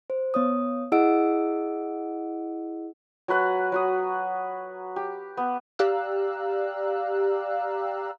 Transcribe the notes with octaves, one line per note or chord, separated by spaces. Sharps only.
C5
B3 C#5 D#6
E4 G#4 D#5 F#5 E6 D7
F#3 F#4 B4 F#5
F#3 F#4 D#6
G4
B3
G4 D5 F5 A#5 E6 F#6